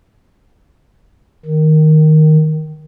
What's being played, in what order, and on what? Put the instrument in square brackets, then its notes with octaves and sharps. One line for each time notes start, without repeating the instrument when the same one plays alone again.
[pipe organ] D#3